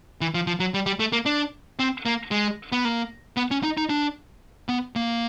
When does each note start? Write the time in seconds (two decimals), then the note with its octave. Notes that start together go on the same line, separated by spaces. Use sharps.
0.21 E3
0.34 F3
0.47 F3
0.60 F#3
0.74 G3
0.86 G3
1.00 A3
1.12 A#3
1.26 D4
1.79 C4
2.06 A#3
2.31 G#3
2.72 B3
2.85 A#3
3.37 B3
3.51 C#4
3.63 D#4
3.77 D#4
3.89 D4
4.69 B3
4.96 A#3